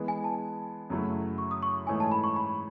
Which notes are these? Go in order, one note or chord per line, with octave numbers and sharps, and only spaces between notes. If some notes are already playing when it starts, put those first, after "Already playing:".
Already playing: E3 G#3 B3
G#5
A5
F#2 C#3 F#3 A3 E4
C#6
D#6
C#6
G#2 E3 A3 C#4 G#4 G#5
A5
B5
C#6
B5